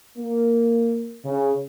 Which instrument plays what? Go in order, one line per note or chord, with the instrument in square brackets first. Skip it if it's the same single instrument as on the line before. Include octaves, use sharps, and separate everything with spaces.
[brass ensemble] A#3
C#3